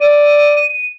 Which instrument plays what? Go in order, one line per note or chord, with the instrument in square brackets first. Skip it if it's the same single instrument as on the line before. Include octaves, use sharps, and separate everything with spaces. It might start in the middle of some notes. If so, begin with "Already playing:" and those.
[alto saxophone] D5 [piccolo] D#7